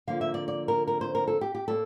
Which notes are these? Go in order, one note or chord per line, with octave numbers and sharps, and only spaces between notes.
D3 F3 A#3 F5
E5
D5
D5
A#4
A#4
C5
A#4
A4
G4
G4
A2 G3 A#3 A4